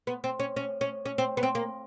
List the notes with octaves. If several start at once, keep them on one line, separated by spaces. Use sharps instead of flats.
B3
C4
C#4
C#4
C#4
C#4
C4
B3
C4
A#3